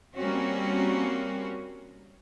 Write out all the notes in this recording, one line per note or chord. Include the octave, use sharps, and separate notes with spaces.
G3 A#3 C4 C#4 F#4